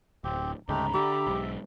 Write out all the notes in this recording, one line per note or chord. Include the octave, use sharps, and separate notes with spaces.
D1 C4 G4
D2 G#2 C#3 G#3 A3 G4 A#5 B5
D3 G4 E5
B1 G#2